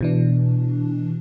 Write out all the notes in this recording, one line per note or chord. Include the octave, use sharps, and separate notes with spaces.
B2 E3 D4